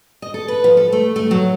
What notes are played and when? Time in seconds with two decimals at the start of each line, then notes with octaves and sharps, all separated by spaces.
0.22 D#5
0.34 A4
0.48 B4
0.64 F3
0.77 A4
0.92 A3
1.16 A3
1.31 F#3